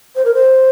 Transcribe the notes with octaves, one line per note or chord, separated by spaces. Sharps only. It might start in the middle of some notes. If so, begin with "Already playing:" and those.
C5
A#4
C5